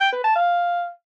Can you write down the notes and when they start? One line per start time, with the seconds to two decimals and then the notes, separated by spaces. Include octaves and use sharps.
0.01 G5
0.12 B4
0.24 A5
0.36 F5